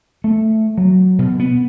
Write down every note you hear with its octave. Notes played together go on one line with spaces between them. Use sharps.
A3
F#3
B2
B3